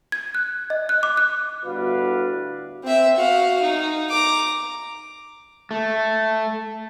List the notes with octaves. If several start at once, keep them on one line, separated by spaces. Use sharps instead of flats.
G#6
F#6
D#5
F#6
D6
F#6
G1 A2 F#4 B4 D5 F5
C4 E5
F#4 F5
D#4
A#5 D6
A3